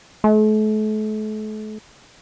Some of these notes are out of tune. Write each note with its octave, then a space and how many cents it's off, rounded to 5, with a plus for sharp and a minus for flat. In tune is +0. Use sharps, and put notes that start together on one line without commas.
A3 -40